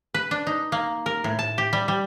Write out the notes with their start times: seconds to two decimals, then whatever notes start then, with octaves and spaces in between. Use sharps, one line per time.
0.14 B4
0.31 D4
0.47 D#4
0.72 A#3
1.06 A#4
1.24 A2
1.39 A5
1.58 G4
1.73 G3
1.88 G3